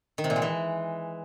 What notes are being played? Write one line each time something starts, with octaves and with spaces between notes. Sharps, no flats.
D#3
C3
A#2
G#3
E3